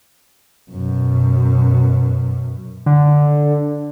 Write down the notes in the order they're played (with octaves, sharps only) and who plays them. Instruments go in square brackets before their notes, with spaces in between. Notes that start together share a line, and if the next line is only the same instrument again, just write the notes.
[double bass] F#2 B2
[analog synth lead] D3